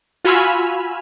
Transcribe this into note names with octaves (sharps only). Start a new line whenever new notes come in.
F4 F#4 G#5 B5 E6 F6